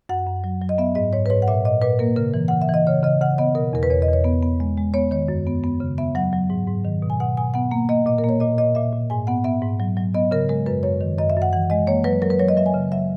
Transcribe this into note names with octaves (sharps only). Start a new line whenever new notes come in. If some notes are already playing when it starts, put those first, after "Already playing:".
F#2 F#5
F#2
F#3
F#3
D#5
B3 E5
G#2 D#5
G#2 C#5
B4
G#2 C#5
F#5
A#2 E5
A#2 D#5
A#2 B4
A#3 A#4
C#3 A#4
E3
C#3 F#5
E5
E3 D#5
C#3 C#5
C#3 D#5
C#3 F#5
B3 D#5
B2 A#4
E2 A#4
B4
E2 C#5
D#5
E2
C#5
B3
B3
G#3
G#3
B3 C#5
D#3 C#5
F#2
B3
B3
C#3
B3 E5
F#3 F#5
F#3
G#2
G#2
D#3
B2
G#5
B2 F#5
B2 G#5
B3 F#5
A#3
A#3 D#5
A#2 D#5
A#4
A#3
C#5
A#2 D#5
A#2 D#5
A#2 E5
A#2
G#2 G#5
B3 F#5
B3 E5
G#2
F#3
F#3
B3 D#5
C#3 A#4
G#3 A#4
F#2 B4
F#2 C#5
D#3
F#2 D#5
E5
F#2
F#5
E3 F#5
G#3 D#5
A#3 C#5
F#3 B4
F#3 A#4
B4
F#3 C#5
D#5
F#3 E5
G#5
C#3
F#3 E5